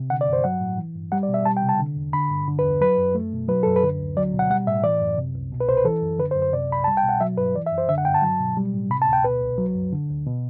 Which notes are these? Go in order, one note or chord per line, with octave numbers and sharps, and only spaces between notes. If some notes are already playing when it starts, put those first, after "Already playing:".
Already playing: C3
D3 F#5
D5
G2
C5
F#3 F#5
A2
E3
G2
G3 F#5
D5
B2
E5
G3 A5
G5
C3
A5
D3
E2
D3 B5
G2
D3
B4
E2
F#3 B4
F#2
A3
B2
F#3 B4
F#2 A4
B4
D3
D2
F#3 D5
B2
F#5
G3 F#5
A2 E5
E3 D5
F#2
C3
C2
B2
B4
C2 C5
B4
E3 A4
F#2
D3 B4
C5
F#2
C5
C3 D5
C2 B5
G3 A5
G5
B2
F#5
F#3 E5
G2 B4
E3 D5
E5
F#2
C5
D3 E5
F#5
G2 G5
A5
F#3
B2
G3
A2
C3 B5
A5
D2
G5
B2 B4
C2
F#3
F#2
D3
D2
B2